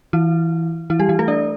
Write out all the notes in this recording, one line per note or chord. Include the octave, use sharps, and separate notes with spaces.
E3 E4
E3 E4
G3 G4
E3 E4
A3 A4
D4 D5